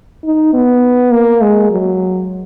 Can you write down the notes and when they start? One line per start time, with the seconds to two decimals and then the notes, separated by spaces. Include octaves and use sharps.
0.24 D#4
0.53 B3
1.11 A#3
1.41 G#3
1.70 F#3